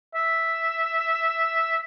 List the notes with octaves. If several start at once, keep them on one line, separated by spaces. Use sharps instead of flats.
E5